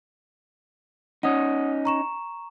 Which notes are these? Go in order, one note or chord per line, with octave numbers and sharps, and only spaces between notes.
C#4 D#4 F#5 D#6
A#5 C#6 E7